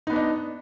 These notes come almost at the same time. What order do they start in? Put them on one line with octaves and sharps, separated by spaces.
D#4 B3 D4 D#5